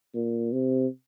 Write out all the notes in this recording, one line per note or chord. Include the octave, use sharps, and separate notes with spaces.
A#2
C3